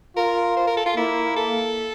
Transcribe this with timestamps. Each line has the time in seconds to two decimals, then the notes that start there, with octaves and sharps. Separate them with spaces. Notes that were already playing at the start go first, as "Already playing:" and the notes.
0.17 F4 A#4
0.57 C5
0.67 A#4
0.77 A4
0.86 F4
0.97 A#3 E4
1.36 A4